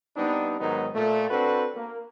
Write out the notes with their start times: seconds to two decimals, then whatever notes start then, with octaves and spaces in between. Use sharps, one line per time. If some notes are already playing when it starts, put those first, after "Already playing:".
0.16 G3 B3 C4 D4 D#4
0.60 G#2 D#3 F#3 B3 D#4 A#4
0.95 A#2 A3
1.30 C4 D4 F#4 A4 B4 C5
1.75 A#3